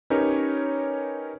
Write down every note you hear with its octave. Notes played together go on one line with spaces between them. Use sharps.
C#4 D#4 G4 A#4 B4 C#5